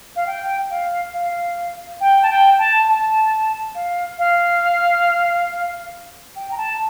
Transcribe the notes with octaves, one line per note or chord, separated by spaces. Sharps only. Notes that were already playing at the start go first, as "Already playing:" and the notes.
F5
G5
F5
F5
G5
A5
G5
A5
A5
F5
F5
G5
A#5
A5